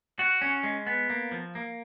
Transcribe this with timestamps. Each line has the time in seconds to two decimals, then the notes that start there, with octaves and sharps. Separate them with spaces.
0.19 F#4
0.41 C#4
0.63 G#3
0.87 B3
1.10 A#3
1.31 F3
1.55 A#3